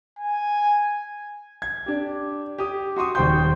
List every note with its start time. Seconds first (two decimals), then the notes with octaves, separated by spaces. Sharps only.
0.19 G#5
1.62 G#6
1.86 D4 G4
2.58 G4 D#6
2.97 F#4 C6 C#6 D#6
3.15 D#1 G3 C5 G5 C6 G6